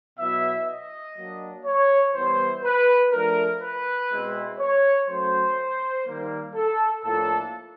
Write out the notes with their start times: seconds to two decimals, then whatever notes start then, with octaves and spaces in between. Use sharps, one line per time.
0.19 B2 F#3 B3 E4 E5
0.68 D#5
1.16 F#3 A#3 D4
1.65 C#5
2.14 E3 G3 B3 E4 C5
2.64 B4
3.12 F3 A3 D4 A#4
3.61 B4
4.11 B2 G#3 C4 E4
4.60 C#5
5.08 F#3 A3 C#4 C5
6.07 D#3 G3 A#3
6.55 A4
7.04 A2 F3 A#3 D4 F4 A4